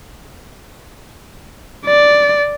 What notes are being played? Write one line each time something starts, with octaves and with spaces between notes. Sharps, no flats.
D5